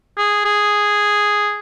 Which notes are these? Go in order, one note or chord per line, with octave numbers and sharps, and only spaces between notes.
G#4
G#4